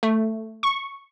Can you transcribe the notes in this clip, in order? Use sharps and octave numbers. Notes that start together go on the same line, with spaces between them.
A3
C#6